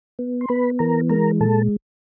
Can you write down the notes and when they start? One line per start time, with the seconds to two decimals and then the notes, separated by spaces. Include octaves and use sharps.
0.19 B3
0.41 C6
0.49 B3 B4 B5
0.79 E3 A#4 A#5
1.09 G#3 A#4 A#5
1.40 A#2 A4 A5